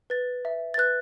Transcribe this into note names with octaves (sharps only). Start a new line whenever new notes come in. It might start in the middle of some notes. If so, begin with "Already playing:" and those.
B4 A6
E5
A6
B4 F#6